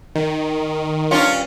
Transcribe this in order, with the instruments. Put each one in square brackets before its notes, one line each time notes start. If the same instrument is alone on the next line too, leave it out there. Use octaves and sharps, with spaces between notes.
[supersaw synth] D#3
[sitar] G2 C#4 F4